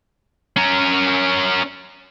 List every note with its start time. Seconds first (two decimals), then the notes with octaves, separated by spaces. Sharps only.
0.56 C#4 A#4